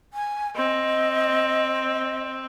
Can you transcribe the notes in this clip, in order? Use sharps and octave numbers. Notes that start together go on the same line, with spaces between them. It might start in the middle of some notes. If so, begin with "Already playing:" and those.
G#5
C4 D#5